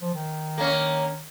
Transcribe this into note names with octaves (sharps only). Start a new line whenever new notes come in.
F3
D#3
A#3 C#4